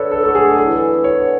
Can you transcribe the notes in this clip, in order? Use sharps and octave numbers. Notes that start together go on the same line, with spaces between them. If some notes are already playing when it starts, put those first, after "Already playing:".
Already playing: D3 A4 B4 C#5 D5
A4
F#3 A3 D4 A4
G#4
E3 A4
B3 D4 F#4
C#5